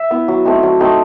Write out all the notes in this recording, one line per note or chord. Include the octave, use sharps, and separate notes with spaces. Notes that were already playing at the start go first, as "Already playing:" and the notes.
Already playing: E5
B3 E4
F#3
A3 C4 D#4
F#3
A3 C4 D#4